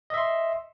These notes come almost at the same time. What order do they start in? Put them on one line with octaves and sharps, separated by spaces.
D#5 E5 C6